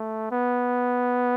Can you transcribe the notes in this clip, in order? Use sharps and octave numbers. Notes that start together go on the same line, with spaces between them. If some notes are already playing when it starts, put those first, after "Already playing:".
Already playing: A3
B3